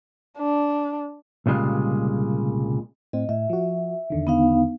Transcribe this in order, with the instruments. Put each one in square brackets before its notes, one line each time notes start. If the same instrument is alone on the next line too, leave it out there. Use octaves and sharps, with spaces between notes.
[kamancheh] D4
[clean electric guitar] C2 A#2 C#3 G3 G#3
[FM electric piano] A2 C4 [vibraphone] D#5
[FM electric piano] A2 [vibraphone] E5
[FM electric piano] F3 F#4
E2 D3 D#3
[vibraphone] B3 D#4 F5